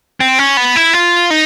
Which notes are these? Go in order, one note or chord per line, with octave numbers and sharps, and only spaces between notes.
C4
C#4
B3
E4
F4
D#4